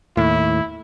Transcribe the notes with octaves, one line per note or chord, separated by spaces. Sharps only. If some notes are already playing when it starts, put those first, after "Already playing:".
D#2 A2 E4